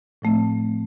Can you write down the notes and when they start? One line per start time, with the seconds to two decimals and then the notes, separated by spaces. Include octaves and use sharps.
0.22 A2 F3 A3 C4